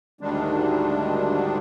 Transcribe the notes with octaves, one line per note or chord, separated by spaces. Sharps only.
D2 G#2 D#3 G3 G#3 D4